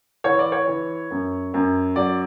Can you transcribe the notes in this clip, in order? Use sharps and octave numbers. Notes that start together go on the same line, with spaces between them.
E3 C#5
D5
C#5
E3
F#2
F#2
F#3 D5